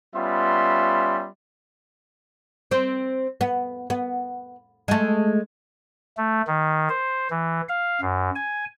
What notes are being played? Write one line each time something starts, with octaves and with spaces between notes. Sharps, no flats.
G3 B3 C#4 F4 E5 C6
C4 C5
B3
B3
G#3 A3
A3
D#3
C5
E3
F5
F#2
G#5